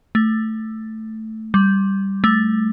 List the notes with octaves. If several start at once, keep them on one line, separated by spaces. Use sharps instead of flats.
A3
G3
A3